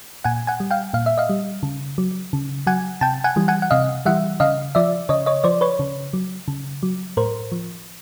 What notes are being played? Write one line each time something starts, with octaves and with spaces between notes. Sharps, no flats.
A#2 F#5 G#5
F#5 G#5
G3
F5 G5
A#2 F5
E5
D#5 F5
G3
C#3
F#3
C#3
F#3 F#5 G#5
C3 G5 A5
F#5 G#5
E3 G3
F#5 G#5
F#5
C3 D#5 F5
E3 G3 E5 F#5
C#3 D#5 F5
F3 D5 E5
C#3 C#5 D#5
C#5 D#5
F3 C5 D5
B4 C#5
C#3
F#3
C#3
F#3
A2 A#4 C5
F3